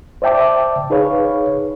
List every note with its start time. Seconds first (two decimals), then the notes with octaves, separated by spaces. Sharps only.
0.22 C5 D5 E5 G5 A5 D6
0.90 D#4 G#4 B4 C#5 F5